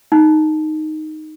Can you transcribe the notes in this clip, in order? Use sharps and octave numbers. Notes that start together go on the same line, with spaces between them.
D#4